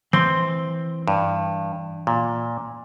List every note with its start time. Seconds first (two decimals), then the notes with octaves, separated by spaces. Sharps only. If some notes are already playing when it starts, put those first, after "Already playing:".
0.13 E3 C4 C6
1.08 G2
2.07 A#2